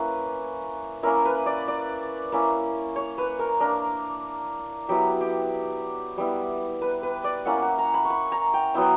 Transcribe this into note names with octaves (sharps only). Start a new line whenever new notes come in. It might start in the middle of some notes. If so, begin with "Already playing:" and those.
Already playing: A#3 C#4 E4 B4
A#3 C#4 E4 A#4
B4
D5
D5
A#3 C#4 E4
C#5
B4
A#4
A#3 D4 A#4
F#3 B3 E4 G4
G4
G3 B3 E4
B4
B4
D5
A#3 C#4 E4 F#5
F#5
A#5
B5
C#6
B5
A#5
G5
F#3 B3 E4 G5